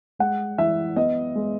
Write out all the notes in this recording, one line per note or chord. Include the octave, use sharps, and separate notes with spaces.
G#3 F#5
E3 E5
B3 D#5
G#3